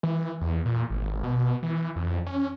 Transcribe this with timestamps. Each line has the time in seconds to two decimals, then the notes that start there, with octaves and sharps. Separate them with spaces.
0.03 E3
0.41 E2
0.65 A#2
0.90 G#1
1.24 B2
1.63 E3
1.96 F2
2.26 C#4